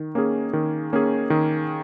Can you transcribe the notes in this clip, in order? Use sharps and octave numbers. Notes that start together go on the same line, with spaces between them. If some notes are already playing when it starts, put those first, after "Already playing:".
Already playing: D#3
A#3 C#4 G#4
D#3
A#3 C#4 G#4
D#3